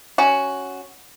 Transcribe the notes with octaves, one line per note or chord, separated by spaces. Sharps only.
C#4 F#4